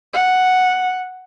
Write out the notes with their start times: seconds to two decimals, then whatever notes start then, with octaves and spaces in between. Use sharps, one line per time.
0.14 F#5